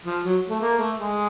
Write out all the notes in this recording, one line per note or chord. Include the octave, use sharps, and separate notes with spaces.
F3
F#3
A3
A#3
A3
G#3